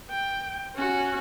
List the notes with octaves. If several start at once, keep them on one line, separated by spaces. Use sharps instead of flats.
G5
C#4 F#4